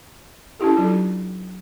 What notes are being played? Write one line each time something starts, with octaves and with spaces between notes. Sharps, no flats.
C#4 D4 E4 G4 A4
F#3 D4 F4 A4